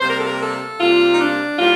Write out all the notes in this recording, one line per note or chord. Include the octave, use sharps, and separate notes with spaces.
C3 G3 A#3 C5
A#4
A4
A#4
A4
C3 G3 A#3 F4
D#4
D4
A2 G3 A#3 F4